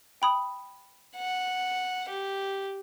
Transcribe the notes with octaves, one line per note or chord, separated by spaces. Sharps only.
G5 B5 D#6
F#5
G4